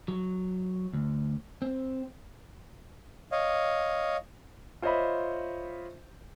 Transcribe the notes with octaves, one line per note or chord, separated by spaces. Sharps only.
F#3
D2
C4
C#5 D#5 F5
F4 C5 C#5 D#5 E5 B5